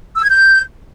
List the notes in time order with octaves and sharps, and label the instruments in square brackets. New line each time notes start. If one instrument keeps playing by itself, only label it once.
[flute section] E6
G#6
G6